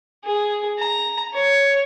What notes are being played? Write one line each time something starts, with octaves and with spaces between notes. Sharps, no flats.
G#4
A#5
C#5